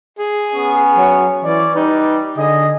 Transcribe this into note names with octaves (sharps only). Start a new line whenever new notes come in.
G#4
B3 C#4
F#3
E3 C#4 D5
G3 D#4 B4
D3 G#4 D#5